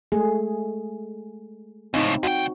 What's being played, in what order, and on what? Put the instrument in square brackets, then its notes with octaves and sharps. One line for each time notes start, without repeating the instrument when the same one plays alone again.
[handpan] G#3 A3 G#4
[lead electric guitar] C#2 A2 [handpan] C4 D#4
[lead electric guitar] D2 G5 [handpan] F#4